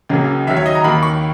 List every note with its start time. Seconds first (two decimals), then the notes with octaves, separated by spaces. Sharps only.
0.09 C#2 C#3 F#3 A#3
0.47 D#2 D#3 F#3 E5
0.56 C#5
0.66 D#5
0.75 A#5
0.84 D#2 D#3 A#3 B5
1.03 C#6